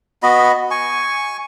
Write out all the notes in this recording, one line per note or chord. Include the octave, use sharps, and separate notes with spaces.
B3 F#4 D#5 B5
G#5 C#6